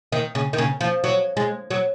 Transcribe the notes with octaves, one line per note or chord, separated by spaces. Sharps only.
D#3
C#3
D#3
C#3
F3
F#3
G#3
F#3